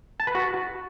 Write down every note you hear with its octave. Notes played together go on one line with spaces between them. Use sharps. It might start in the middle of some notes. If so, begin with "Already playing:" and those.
A5
B4
F#4